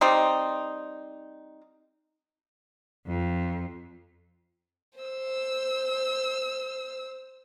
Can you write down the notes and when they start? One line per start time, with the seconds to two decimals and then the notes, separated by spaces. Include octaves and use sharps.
0.01 G3 C4 D#4
3.05 F2
4.99 C5 E6